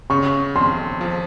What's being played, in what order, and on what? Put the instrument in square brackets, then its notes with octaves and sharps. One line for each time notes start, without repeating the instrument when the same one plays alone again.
[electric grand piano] C#3 [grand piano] C#6
[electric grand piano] F2 [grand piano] C6
[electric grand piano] F3